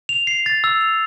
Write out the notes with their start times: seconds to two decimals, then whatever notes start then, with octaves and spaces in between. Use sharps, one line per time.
0.09 F7
0.27 C7
0.46 A6
0.64 E6
0.81 F7